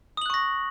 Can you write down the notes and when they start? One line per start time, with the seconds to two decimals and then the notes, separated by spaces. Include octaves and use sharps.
0.17 D#6
0.22 F#7
0.26 F#6
0.30 C#6
0.34 A#6